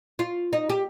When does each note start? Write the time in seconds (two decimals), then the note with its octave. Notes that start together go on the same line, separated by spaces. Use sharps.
0.19 F4
0.53 D#4
0.69 G4